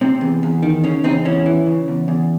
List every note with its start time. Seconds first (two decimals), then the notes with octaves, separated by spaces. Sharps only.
0.01 C3 C4
0.21 E2
0.43 E2
0.63 D#3
0.84 C#3 C#4
1.04 E2 C4 D#4
1.25 E2 C#4 E4
1.46 E3
1.66 C#3
1.88 E2
2.08 E2